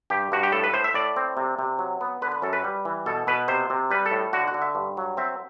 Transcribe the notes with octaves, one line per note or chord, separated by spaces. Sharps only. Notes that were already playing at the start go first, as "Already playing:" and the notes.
G2 G4
G2 F#4
G4
A2 A4
B4
A2 C5
E5
A2 D5
C4
C3
C3
F#3
B3
D3 B4
B4
F#2 A4
B4
G3
E3
B2 A4
B2 B4
C3 C5
C3
G3 B4
A4
A2
D3 F#4
F#4
D3
E5
G2
F#3
C4 E5